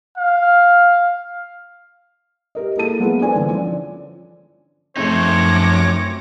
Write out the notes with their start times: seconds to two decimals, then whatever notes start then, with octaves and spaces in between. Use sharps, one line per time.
0.18 F5
2.55 G4 A#4 D#5
2.77 A#3 E4 G#4 A4 A5 D#7
2.99 F#3 G#3 B3 F4 G#4 B4
3.20 D4 F4 A4 C5 D5 G#5
3.34 D3 E3
3.49 F3 C#4 D5
4.97 F#2 F3 A3 C4 D#4 C#5 D6 A#6